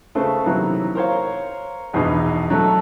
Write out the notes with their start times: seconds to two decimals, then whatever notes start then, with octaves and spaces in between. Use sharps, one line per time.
0.15 C#3 A3 B4 C5
0.46 C3 D#3 E3 F#3 A#3 B3
0.95 A#4 C5 C#5 F5
1.93 A#1 E2 B2 D#4 D#5
2.50 F#3 A3 A4